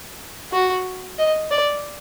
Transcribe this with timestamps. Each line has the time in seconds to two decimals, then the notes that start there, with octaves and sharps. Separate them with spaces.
0.52 F#4
1.18 D#5
1.51 D5